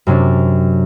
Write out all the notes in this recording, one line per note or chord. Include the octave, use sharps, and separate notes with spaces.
F#2 C3 C#4 D4